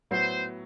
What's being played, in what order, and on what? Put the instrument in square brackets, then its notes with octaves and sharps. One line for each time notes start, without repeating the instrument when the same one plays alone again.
[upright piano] A2 F#3 B3 [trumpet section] C5